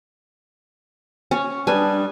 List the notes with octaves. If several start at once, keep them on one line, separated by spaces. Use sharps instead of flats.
C#4 C#6
G3 D4 G4 B4 G#5 A5 D#6